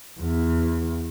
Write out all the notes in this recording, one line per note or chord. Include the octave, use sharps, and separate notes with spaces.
E2